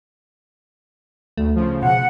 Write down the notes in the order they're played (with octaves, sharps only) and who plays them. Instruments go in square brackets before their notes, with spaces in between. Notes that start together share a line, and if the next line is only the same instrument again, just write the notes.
[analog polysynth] D2 [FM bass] A3
[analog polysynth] C#3 F3
[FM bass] B2 [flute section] F#5